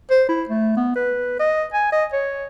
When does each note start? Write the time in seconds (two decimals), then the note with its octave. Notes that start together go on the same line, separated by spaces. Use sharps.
0.10 C5
0.29 E4
0.49 A3
0.77 B3
0.96 B4
1.39 D#5
1.73 G#5
1.92 D#5
2.13 C#5